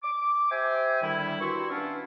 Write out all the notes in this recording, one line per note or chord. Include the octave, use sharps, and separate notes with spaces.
D6
G4 C5 E5 G5 G#5
D3 D#3 G3 E4
G2 E4 F#4 C6 C#6 E6
B3 C#4 D4 E4 F4